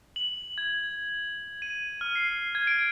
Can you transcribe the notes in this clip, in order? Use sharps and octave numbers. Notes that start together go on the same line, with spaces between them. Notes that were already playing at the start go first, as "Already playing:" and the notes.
F#7
G#6
D#7
F6
C7
G#6
D7